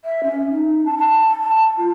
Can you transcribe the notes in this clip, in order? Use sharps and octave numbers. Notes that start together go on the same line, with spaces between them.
E5
C#4
D#4
A5
A5
A5
F4